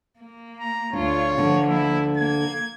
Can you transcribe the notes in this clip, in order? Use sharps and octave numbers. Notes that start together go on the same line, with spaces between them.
A#3
A#5
D2 D4 F4 C#5
D2 D3 F3 A#3
E4
A#3 G#6